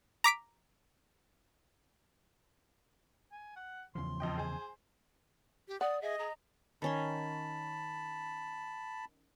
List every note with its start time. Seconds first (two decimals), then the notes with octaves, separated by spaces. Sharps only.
0.24 A#5 D6 B6 D7
3.32 G#5
3.56 F#5
3.95 E2 C#3 F3 C6
4.20 F2 D#5 G5
4.37 G#4 C5 G#5
5.68 G4
5.81 D5 F#5 D#6
6.02 G#4 D#5 E5
6.19 G#4 A#5
6.82 D#3 C#4 A5 B5 C6